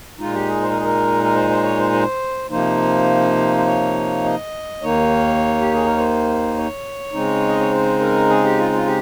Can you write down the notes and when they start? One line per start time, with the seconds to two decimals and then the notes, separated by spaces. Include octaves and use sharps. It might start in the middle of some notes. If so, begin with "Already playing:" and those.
0.19 A#2 G#3 D#4 F4
0.34 G4
0.48 G#4
0.62 C5
0.70 A#4
0.78 G#4
0.85 A#4
1.24 A#4
1.35 C5
1.50 C5
1.63 C#5
1.78 C5
1.93 C5
2.50 C3 F3 A#3 D#4 C5
3.57 C5
3.66 C#5
4.24 D#5
4.82 D#2 D#3 A#3 D#4 C#5
5.61 G4
5.74 G#4
5.85 A#4
5.97 C5
6.56 C#5
7.13 C#3 G#3 C4 D#4
7.49 D#5
7.60 C#5
7.71 C5
8.00 A#4
8.29 G#4
8.44 G4
8.58 F4
8.73 F4
8.87 G4